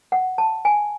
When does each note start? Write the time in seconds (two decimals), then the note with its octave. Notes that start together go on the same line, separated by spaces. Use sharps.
0.12 F#5
0.38 A5
0.65 G#5